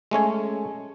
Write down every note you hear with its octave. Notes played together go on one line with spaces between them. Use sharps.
G#3 A3 C#4 C#5